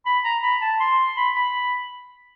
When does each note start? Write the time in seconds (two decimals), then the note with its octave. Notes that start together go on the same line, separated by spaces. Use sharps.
0.06 B5
0.25 A#5
0.43 B5
0.62 A5
0.80 C6
1.17 B5
1.36 B5